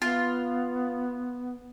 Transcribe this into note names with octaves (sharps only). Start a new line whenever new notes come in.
B3 F4